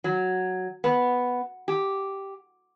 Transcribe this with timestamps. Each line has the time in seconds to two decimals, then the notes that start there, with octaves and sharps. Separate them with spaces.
0.04 F#3
0.84 B3
1.68 G4